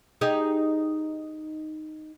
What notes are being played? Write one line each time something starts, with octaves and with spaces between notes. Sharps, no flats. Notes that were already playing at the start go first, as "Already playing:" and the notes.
D#4 G4 G#4